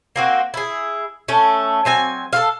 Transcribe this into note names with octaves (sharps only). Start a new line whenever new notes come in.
A#3 C4 F#4
E4 G#4
A3 C#4
F#3 C4 G#5
A4 C5 F5